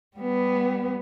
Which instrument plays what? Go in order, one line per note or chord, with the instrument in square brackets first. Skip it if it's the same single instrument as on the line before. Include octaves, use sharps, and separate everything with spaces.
[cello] G3 B3